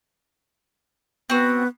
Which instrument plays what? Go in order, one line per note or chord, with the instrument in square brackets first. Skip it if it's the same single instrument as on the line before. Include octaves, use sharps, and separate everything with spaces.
[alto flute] B3 [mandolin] C4 F#4